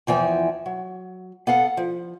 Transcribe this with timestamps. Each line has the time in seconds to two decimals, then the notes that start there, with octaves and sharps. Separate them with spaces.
0.07 E2 E3 F3 G5 G#5
0.66 F#3
1.47 B3 A4 F5 F#5
1.77 F3